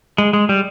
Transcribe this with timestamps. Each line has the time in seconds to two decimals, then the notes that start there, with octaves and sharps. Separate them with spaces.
0.18 G#3
0.33 G#3
0.49 G3